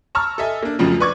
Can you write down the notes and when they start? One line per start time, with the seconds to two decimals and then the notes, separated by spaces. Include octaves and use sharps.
0.15 A5 A#5 C#6 E6 F6
0.38 A4 D#5 E5 G#5
0.63 A#3 D4
0.79 F2 A2 C#3 F3 F#3
1.00 B4 D5 C#6 D6 G#6